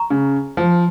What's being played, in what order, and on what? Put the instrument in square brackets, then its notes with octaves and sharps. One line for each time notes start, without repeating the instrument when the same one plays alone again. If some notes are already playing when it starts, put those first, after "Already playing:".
Already playing: [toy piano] A#5 C#6
[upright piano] C#3
F3